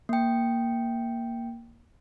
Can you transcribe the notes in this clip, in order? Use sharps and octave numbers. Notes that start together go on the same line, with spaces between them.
A#3 G5